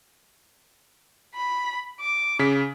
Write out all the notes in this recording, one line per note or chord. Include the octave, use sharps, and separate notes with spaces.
B5
D6
C#3 B6